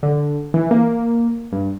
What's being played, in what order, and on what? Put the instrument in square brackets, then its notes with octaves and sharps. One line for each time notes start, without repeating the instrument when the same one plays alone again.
[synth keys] D3
E3
A#3
G2